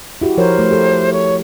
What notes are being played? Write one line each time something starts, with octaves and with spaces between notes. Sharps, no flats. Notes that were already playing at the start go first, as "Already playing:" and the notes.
E4 F#4 G4
F3 A#4 C5 C#5
A3
G4 A4
C#5